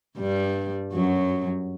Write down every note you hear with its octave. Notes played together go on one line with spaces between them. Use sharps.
G2 G3
F#2 F#3